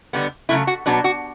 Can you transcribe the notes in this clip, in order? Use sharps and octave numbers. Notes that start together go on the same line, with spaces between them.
D3 G3 B3
C#3 F#3 A3 E4
F#4
B2 F#3 B3 D4
F#4